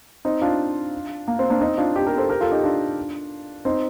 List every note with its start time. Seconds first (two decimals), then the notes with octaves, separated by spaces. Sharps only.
0.25 C4 D#4
0.42 D4 F4
1.28 A#3
1.39 C4
1.50 A#3 D4
1.61 C4 D#4
1.78 D4 F4
1.95 D#4 G4
2.06 G4 A#4
2.17 A4 C5
2.29 G4 A#4
2.41 F4 A4
2.51 D#4 G4
2.64 D4 F4
3.65 C4 D#4